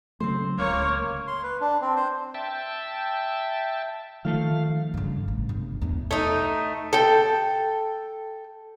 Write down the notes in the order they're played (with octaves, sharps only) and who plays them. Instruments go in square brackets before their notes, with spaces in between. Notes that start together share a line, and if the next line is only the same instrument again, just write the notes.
[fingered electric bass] C#3 F#3 A3 [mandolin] C4 C5
[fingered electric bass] D1 C#2 [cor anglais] A#3 [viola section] C#5
[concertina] C6
B4
D4
C4
C5
[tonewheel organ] E5 G5 A5
[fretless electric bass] D#3 F3 A3 [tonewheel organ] F5
[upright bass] G2 C#3
A1
G1 C3
E2 D4
[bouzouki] A3 D#4
A4 G5